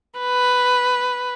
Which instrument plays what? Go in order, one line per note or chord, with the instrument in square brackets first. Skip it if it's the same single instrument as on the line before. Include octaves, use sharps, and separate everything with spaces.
[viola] B4